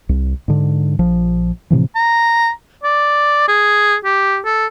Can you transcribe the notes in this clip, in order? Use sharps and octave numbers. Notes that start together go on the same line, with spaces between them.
C2
G#2 D3
A#1 F3
A2 C3 E3 F3
A#5
D5
G#4
G4
A4